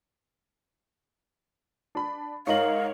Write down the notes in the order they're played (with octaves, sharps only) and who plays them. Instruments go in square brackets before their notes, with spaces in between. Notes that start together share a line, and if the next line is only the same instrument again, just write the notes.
[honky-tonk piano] D4 B5
[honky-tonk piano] G#2 D#4 F#7 [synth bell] A#4 C#5 [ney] F5